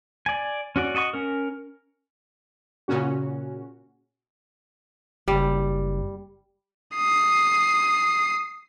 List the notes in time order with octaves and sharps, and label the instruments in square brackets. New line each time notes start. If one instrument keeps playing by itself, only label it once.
[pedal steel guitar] D5 G#5
C#4 F#4 D5
F#4 D#5 A5 C#6
C#4 A#4
[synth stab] A#2 C#3 C#4 F#4
[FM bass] F#1 [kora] G3
[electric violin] D#6 C7